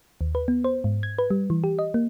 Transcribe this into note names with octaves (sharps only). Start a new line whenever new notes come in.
D#2
B4
B3
C5
G#2
G#6
B4
G3
E3
G4
D#5
A#3